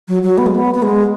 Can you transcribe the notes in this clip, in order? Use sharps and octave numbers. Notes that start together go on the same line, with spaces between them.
F#3
F#3
B3
G#3
B3
B3
G#3